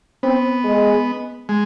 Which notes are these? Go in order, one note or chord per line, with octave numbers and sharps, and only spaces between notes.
B3 C4
G#3
G#3